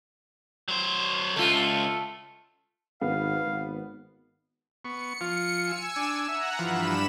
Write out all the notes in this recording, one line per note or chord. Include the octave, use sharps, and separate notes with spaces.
F#3 C5
C#2 A3 F4
G#1 B3 F5
G#1
B3 C#6 C#7
F3 F4
G#5 E6
D4
E5 F#5 A#5 F#6
G2 E3 F3 B5 E7